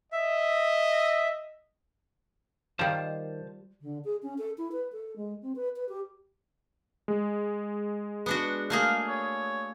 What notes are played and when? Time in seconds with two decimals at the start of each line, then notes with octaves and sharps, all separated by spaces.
0.12 D#5 E5
2.79 D#3 G3 F4 C5 A5
3.81 D3
4.04 G#4
4.23 C#4
4.38 A4
4.58 E4
4.72 B4
4.92 A4
5.16 G#3
5.42 C4
5.56 B4
5.76 B4
5.89 G4
7.08 G#3
8.26 B3 D4 F#4
8.70 A3 A#3 G#4 F5
9.08 C#5